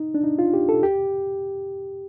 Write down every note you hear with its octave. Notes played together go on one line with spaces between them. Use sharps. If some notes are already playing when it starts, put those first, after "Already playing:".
Already playing: D#4
D4
D#4
F4
G4
A4
G4